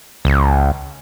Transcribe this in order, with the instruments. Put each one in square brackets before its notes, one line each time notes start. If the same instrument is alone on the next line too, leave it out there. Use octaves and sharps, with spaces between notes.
[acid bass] C#2